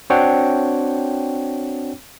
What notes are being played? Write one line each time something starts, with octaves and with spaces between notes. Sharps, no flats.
C4 D4 F#4 C#5 F#5 G5